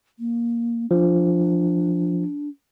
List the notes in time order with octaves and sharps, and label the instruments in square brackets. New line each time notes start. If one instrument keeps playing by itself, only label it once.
[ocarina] A#3
[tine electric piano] F3 [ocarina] D4